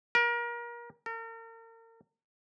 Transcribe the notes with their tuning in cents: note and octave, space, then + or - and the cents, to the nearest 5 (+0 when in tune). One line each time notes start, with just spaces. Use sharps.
A#4 +30
A#4 -40